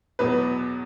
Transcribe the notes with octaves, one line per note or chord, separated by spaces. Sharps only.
E2 B2 F#3 B4